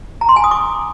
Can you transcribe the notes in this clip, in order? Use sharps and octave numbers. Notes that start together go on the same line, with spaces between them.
A#5
C6
G#5
D#6
D6